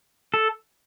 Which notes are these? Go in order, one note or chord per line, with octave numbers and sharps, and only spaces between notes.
A4